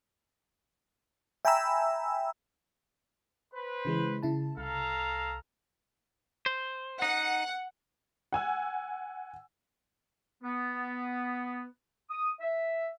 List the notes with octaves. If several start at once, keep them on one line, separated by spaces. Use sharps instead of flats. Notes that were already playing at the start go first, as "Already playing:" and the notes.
E5 G5 G#5 A#5 B5 E6
B4 C5
C#3 E3 G#3
C#3 E4 A5
C2 A4 F5 A#5
C5
D#4 F#5
F#5 G#5 E6
B3
D#6
E5